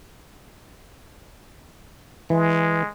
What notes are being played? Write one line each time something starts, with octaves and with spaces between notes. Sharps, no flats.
E3 G#3